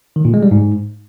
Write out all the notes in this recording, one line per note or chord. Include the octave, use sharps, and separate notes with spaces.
D#3
A#2
G#3
G3
G#2